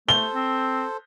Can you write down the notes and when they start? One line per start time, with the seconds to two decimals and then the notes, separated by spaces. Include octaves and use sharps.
0.09 A3 A4 C5 G7
0.34 C4